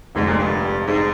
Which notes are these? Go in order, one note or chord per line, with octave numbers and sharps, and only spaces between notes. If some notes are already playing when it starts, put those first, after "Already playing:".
F1 F2 G#2 D3 G#3 D4
A#2
G2
G#2